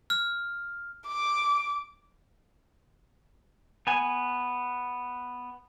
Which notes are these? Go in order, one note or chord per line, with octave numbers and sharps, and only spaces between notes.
F6
D6
B3 G#5